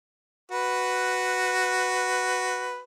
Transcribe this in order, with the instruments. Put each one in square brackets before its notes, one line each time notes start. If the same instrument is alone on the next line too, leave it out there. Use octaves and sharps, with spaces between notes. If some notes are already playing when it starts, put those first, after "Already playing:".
[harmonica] F#4 B4